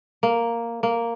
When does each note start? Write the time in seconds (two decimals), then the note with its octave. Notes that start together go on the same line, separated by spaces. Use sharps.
0.23 A#3
0.83 A#3